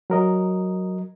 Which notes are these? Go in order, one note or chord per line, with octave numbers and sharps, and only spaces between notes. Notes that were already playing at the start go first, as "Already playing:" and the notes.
F#3 A#4 D#5